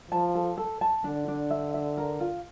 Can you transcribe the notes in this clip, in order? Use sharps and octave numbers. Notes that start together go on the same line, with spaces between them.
F3 A5
A4
A4
A5
D3 D4
D4
E5
E5
A#4
F4